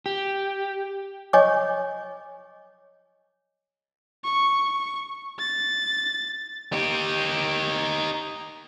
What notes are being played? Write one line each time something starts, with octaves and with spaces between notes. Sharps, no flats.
G4
C#5 D#5 G#5 C#6 D6
C#6
A6
D#4 G4